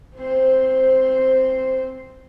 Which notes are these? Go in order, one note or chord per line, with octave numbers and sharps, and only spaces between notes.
C4 C5